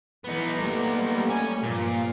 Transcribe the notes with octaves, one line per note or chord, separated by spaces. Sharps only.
E3 B3 D#4
G3 A3 A#3
C#4 G#5
G2 A#2 F3